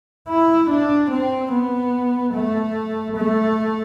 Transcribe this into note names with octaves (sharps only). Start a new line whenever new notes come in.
E4
D4
C4
B3
A3
A3